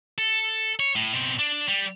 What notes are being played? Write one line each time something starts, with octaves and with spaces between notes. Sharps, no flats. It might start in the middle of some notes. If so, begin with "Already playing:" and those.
A4
C#5
A2
B2 C4
D4
G3